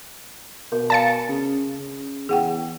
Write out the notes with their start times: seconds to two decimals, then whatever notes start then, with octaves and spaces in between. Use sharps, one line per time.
0.72 B2 A#4
0.90 D5 F5 G#5 A5 A6 C#7
1.29 C#3
1.79 C#3
2.29 E2 G#4 F#5 G5